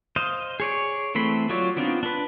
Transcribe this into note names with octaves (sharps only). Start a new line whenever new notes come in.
C5 D#5 F5
G#4 C#5 D5
E3 A3 C4 B5 C6
F#3 F4 C#5 D5
B3 C4 D4 D#4 F4
D4 B4